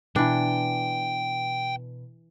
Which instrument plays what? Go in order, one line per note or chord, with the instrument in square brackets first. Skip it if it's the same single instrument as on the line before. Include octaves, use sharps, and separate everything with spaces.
[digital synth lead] B2 [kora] E3 D4 [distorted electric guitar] G5